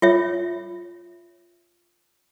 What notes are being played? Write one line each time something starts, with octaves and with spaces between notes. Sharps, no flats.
F4 C#5 E5